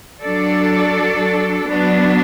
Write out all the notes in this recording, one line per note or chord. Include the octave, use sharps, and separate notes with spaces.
F#3 D4 A4 D5
F#3 B3 D4